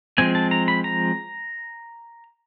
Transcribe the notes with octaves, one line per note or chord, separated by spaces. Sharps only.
F3 G#3 C4 G#5
A5
A#5
B5
A#5